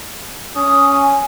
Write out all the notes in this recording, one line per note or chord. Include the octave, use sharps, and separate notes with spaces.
C#4 D#6
G#5